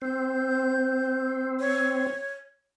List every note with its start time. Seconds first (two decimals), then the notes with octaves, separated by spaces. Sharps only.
0.02 C4 G6
1.60 C#5